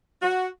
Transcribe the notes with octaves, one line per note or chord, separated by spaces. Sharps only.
F#4